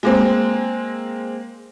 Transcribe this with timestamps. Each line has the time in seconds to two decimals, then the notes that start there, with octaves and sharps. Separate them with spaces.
0.03 G#3 A#3 C4